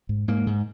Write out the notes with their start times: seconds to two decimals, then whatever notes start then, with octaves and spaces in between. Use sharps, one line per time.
0.09 G#2
0.28 G#2 A#3
0.47 G#2